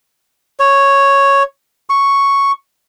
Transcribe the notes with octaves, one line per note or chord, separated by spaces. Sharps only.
C#5
C#6